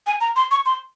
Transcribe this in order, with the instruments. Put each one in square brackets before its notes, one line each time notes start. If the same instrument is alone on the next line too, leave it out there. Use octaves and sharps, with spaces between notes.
[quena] G#5
A#5
C6
C#6
C6